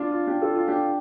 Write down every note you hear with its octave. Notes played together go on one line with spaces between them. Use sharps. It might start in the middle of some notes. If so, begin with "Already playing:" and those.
Already playing: D4 F4
F4
D4 G4
F4 A4
F4
D4 G4